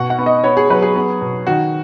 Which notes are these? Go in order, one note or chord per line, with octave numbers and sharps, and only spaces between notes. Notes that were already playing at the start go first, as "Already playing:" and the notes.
Already playing: B2 F#5
F#5
B3
D#5
B3 C#5
G#4
F#3 B4
G#4
B3
B2
D#3 F#4